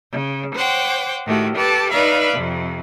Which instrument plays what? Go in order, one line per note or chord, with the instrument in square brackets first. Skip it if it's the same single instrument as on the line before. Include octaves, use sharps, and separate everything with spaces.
[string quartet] C#3
C5 C#5 F#5 G5 D6
A2 D#3 A3 F#4 G4
G4 A4 B4 A5 D6
D#4 B4 D5 E5 F5 B5
F2 C3